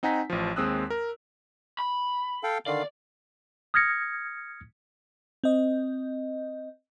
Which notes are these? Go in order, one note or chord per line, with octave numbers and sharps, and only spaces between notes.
C4 D#4 F#5 G#5 A#5 B6
A1 F3
D#2 G#3 C4 D#6 E6 F#6
A#4
B5
A4 F5 G5
D3 D#3 D5 F5
D#6 F6 G#6 A#6 C#7
C4 D#5